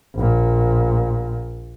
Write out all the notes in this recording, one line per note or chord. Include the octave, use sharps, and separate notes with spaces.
A#1 A#2